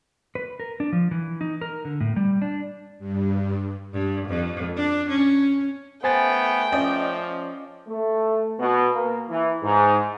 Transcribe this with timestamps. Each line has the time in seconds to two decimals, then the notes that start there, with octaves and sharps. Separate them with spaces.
0.35 B4
0.60 A#4
0.80 D4
0.92 F3
1.11 E3
1.41 D#4
1.62 A#4
1.85 D3
2.01 A2
2.16 G3
2.42 D4
2.99 G2
3.92 G2
4.28 F2
4.76 D4
5.09 C#4
6.04 A3 B3 C5 G5 G#5 A6
6.72 F3 C#4 D5 D#5
7.88 A3
8.60 B2
8.94 A#3
9.30 E3
9.64 G#2